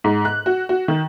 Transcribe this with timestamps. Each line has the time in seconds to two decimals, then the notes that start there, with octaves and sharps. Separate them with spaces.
0.04 G#2
0.25 F#6
0.46 F#4
0.69 F#4
0.88 D#3